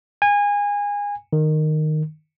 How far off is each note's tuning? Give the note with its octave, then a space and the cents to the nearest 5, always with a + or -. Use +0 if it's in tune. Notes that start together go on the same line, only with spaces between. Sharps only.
G#5 -25
D#3 -15